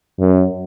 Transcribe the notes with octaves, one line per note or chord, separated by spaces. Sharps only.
F#2